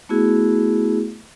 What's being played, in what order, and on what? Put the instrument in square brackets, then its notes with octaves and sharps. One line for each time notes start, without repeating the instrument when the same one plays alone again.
[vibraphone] A3 B3 E4 F#4 G#4